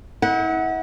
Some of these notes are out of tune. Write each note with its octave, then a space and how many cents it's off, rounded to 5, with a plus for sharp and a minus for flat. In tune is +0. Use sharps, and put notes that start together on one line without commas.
E4 -40 F#5 +0